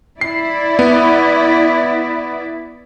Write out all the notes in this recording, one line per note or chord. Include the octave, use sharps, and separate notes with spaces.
E4 D5 C7
B3